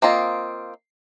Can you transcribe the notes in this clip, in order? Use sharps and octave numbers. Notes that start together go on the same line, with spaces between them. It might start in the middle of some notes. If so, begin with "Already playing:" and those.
A#3 C4 F4 D#5